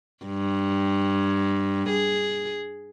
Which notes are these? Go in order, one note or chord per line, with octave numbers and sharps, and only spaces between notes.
G2
G#4